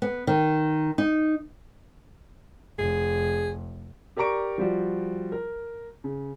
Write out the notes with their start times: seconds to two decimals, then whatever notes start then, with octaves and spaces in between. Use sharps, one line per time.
0.02 B3
0.27 D#3
0.98 D#4
2.78 F1 G#4
4.17 G4 A#4 D5 A#5 C#6 D7
4.58 F3 G3 F#4
5.32 A#4
6.04 C#3